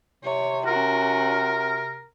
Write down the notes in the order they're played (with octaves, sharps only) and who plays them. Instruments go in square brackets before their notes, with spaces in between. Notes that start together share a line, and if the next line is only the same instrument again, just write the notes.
[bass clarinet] C3 [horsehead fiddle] C#5
[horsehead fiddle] C#4 F#4 [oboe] A#4